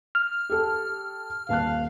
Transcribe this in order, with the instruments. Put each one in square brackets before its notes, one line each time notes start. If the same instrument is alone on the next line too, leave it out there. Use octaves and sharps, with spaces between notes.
[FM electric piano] F6
[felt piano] G4 A4 A5
[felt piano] D#1 A5 F#6 [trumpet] F5